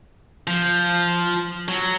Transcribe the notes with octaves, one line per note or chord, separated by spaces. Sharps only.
F3
F#3